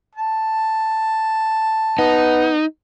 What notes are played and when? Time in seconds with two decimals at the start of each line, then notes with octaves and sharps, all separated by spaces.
0.15 A5
1.99 B3 D#4